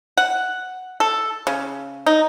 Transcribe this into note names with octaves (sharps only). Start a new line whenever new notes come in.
F#5
A4
C#3
D#4